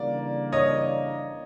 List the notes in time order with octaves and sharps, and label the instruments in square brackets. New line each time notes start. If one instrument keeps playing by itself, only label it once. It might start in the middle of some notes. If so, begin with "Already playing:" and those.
Already playing: [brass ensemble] C#3 E3 G3 A#3 D4 [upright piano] D5
[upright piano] C#5 D#5